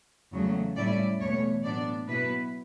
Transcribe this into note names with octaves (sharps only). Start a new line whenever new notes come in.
E2 C#3 F#3 A3
A2 G3 C#4 E4 D5
E2 B2 A3 C#5
A2 F#3 B3 D4 D5
B2 F#3 B3 E4 B4